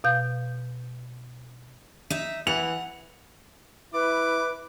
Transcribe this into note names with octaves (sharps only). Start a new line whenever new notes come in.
B2 F5 G6
D#4 E5
E3 F#5 F7
E4 B4 D6